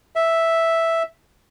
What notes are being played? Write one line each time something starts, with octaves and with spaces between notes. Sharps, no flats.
E5